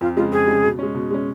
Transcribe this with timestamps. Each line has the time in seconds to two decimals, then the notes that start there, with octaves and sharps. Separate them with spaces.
0.01 F2 F4
0.17 C#3 G#3 F4
0.32 F2 G#4
0.48 C#3 G#3
0.64 B2
0.79 G#3 C#4
0.94 B2
1.11 G#3 C#4